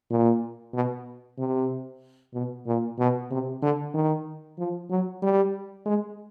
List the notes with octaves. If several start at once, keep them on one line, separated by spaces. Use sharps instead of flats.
A#2
B2
C3
B2
A#2
B2
C3
D3
D#3
F3
F#3
G3
G#3